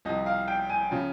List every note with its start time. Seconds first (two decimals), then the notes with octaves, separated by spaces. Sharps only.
0.05 C2 C3 F3 D#5
0.26 F5
0.48 G5
0.70 G#5
0.91 C#3 F3